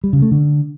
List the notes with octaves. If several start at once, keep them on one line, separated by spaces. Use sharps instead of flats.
G3
C#3
A3
D3